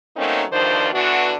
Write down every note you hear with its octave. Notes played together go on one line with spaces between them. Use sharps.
F#3 A3 A#3 C4 C#4 D#4
D2 G2 D#3 F3 D4 C5
D3 E3 B3 D4 F#4